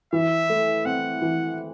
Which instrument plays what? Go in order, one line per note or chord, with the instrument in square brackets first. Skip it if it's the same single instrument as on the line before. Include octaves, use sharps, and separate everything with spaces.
[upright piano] E3 [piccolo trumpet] E5
[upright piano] A3
[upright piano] C4 [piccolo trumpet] F#5
[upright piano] E3